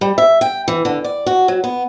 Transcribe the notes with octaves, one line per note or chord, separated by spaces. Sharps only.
G3
E5
G5
E3
D3
D5
F#4
F#3
B3